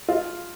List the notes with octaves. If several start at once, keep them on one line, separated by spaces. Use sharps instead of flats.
F4